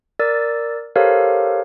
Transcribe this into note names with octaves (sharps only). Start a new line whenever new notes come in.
A#4 D5 E6 A6
G4 A4 A#4 C5 C#5 F5